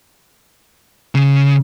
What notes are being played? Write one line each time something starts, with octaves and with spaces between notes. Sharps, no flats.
C#3